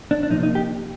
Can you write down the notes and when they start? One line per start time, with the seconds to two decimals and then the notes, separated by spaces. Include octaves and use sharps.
0.11 D4
0.23 D4
0.31 C3 F3 A#3 D#4
0.43 D#4
0.55 G4